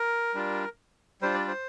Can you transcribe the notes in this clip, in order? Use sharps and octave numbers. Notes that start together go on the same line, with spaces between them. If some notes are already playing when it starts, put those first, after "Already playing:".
Already playing: A#4
G3 D4 F4
G3 D4 F4 C5
D5
C5